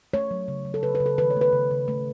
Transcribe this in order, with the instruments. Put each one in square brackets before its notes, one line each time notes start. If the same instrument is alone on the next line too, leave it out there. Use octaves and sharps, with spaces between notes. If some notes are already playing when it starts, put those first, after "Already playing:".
[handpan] A3 C#5
F#3
C#3
F#3
A4
C#3 B4
B4
C#3
A4
D#3 B4
C#5
A3
B4
C#3
C#3
A3